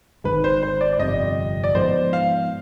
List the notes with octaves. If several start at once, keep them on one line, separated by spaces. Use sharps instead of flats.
G#1 G#2 D#3 G#3 B4
C5
C5
D5
D5
G1 F2 C3 D#5
D5
G#2 F3 G#3 B3 C5
F5